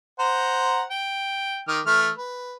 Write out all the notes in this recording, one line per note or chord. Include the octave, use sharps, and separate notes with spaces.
C5 F#5 A#5
G5
D#3 D6 F6
E3 A3 F6
B4